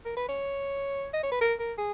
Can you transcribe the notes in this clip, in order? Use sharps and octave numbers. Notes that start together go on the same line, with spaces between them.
A#4
B4
C#5
D#5
C#5
B4
A#4
A#4
G#4